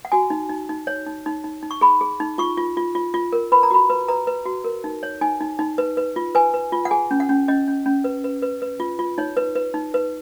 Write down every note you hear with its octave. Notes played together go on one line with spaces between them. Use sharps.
F#5
F#4 G#5
D#4
D#4
D#4
C#5
D#4
D#4
D#4
D#4
C#6
G#4 B5
G#4
D#4
F4 C#6
F4
F4
F4
F4
A#4
B4 B5
A#5
F#4 B5
B4
B4 A#5
B4
F#4
A#4
D#4
C#5
D#4 G#5
D#4
D#4
B4
B4
F4
B4 G#5
B4
F4
F#5
G#4 G#5
C#4
F#5
C#4
C#4 D#5
C#4
C#4
B4
B4
B4
B4
F4
F4
D#4 C#5
B4
B4
D#4
B4